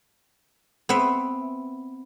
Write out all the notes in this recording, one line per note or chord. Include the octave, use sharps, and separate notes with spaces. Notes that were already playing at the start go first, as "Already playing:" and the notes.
B3 C4 E5